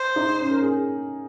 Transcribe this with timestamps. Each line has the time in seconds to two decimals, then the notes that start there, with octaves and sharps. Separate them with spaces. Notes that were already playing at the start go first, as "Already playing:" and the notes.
Already playing: C5
0.16 D#4
0.40 C#4
0.51 A#4
0.62 G#4